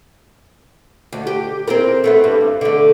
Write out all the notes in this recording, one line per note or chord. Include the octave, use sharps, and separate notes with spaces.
D2
G4
C4 E4 A#4
A3 B3 E4
G2
D3 A3